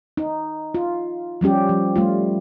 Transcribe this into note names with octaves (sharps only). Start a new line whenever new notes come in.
D#4
F4
F3 G3 C#4 G4
F3
G3 A3 F4